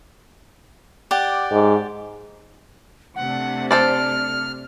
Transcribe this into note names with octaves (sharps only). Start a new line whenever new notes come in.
G4 D5 F#5
G#2
C3 A3 D4 F#5
A4 C5 D5 F6